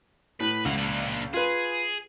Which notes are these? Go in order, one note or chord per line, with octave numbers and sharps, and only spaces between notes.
A2 B4
C#2 E3 F#5
A#2 D4
F4 G#4 B4